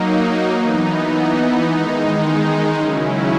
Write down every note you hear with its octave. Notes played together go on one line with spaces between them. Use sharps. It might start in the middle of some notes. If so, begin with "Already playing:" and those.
Already playing: F#3 A#3 D#4
E3 B3 D#4
D#3 G#3 D#4
C#3 F#3 C#4 E4